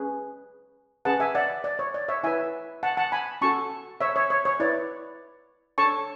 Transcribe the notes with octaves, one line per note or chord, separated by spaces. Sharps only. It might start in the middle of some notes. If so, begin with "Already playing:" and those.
Already playing: C#4 G#4 B4
C#4 G#4 B4 F#5 A5
E5 G#5
D5 F#5
D5
C#5
D5
C#5 E5
E4 B4 E5 G#5
F#5 A5
F#5 A5
G#5 B5
C#4 F#4 A4 A5 C#6
C#5 E5
C#5
C#5
C#5
E4 B4 D5
D4 A4 C#5 A5 C#6